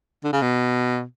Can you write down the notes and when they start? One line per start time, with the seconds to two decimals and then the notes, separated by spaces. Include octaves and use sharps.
0.24 D3
0.32 C#3
0.42 B2